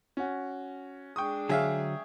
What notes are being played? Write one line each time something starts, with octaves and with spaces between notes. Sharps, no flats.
C#4 F#4
G#3 D4 G5 C#6 D#6
D3 F#3 G#4 E5 F5